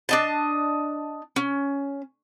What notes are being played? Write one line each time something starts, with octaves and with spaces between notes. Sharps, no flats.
D4 D#5 A5
C#4